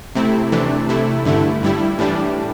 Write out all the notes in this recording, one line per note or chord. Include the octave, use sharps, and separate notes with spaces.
C3 A3 C4 E4
C3 E3 A3 D4
C3 A3 E4
G2 D3 A3 E4
G2 G3 E4
A2 E3 G3 D4